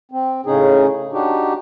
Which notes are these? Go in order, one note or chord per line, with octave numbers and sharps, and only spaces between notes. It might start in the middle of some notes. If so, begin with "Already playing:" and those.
C4
A2 C#3 C#4 D#4 G#4
D4 D#4 F#4 G4